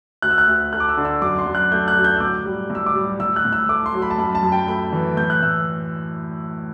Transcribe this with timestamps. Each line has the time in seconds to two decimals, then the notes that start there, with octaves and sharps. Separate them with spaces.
0.22 D2 F#6
0.31 E6
0.38 F#6
0.48 D2
0.73 A3 F#6
0.80 D6
0.89 E6
0.97 D3
1.05 E6
1.22 F#2 D6
1.38 C6
1.46 F#2
1.55 F#6
1.72 A3 G6
1.88 F#6
1.96 F#3
2.04 G6
2.16 E6
2.20 A2 D6
2.45 G3
2.70 A2 E6
2.86 D6
2.95 G3
3.20 A2 E6
3.36 F#6
3.45 A2
3.52 E6
3.69 A3 D6
3.86 C6
3.94 F#3
4.02 B5
4.10 A5
4.18 F#2 B5
4.35 A5
4.43 F#2
4.52 G5
4.68 A3 B5
4.92 E3
5.17 A2 G6
5.30 F#6
5.42 A2 E6